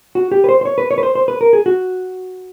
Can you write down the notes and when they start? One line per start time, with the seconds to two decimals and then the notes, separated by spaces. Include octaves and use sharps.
0.15 F#4
0.32 G4
0.44 B4
0.49 C5
0.61 C5
0.65 C#5
0.78 B4
0.91 C#5
0.98 B4
1.03 C5
1.15 C5
1.28 B4
1.41 A#4
1.53 G#4
1.66 F#4